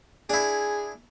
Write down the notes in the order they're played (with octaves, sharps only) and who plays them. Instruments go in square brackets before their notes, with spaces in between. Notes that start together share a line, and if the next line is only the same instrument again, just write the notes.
[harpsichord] D4 E4 [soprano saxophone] G#4